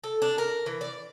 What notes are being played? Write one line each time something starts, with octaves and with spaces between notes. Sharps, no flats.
A4
D4
A#4
E3
D5